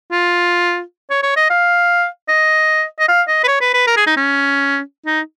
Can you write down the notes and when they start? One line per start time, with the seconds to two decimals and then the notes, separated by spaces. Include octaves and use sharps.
0.12 F4
1.10 C#5
1.23 C#5
1.36 D#5
1.50 F5
2.29 D#5
2.99 D#5
3.08 F5
3.28 D#5
3.44 B4
3.48 C#5
3.61 B4
3.74 B4
3.87 A#4
3.97 G#4
4.07 D#4
4.17 C#4
5.06 D#4